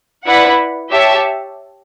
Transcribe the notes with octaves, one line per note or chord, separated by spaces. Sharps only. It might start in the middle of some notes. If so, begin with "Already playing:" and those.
E4 B4 D5 F#5
G4 C#5 E5 A5